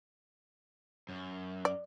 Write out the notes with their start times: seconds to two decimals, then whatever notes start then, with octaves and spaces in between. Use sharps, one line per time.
1.09 F#2
1.65 D5